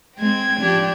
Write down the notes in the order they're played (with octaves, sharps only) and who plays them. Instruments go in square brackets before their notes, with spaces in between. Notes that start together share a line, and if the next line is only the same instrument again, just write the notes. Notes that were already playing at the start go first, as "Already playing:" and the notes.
[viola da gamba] G#3 C4 [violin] G5 G#6
[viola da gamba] F3 D4 G4